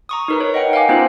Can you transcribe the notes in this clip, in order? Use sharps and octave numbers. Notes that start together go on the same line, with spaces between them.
A#5 C#6 D#6
D#4 A#4 B4
C#5
D#5 F#5 G5
F5 G5 G#5 D6
B3 C#4 D#4 F4 C5 F#6